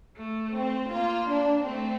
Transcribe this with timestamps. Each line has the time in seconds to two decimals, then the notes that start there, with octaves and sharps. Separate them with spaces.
0.16 A3
0.54 C4
0.91 A#3 F4
1.29 D4
1.66 A3 C4